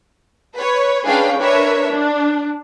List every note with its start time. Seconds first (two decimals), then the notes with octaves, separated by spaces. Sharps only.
0.56 B4 C#5
1.05 C#4 D4 G#4 B4 F5 G5
1.39 D4 A#4 B4 C#5 E5
1.90 D4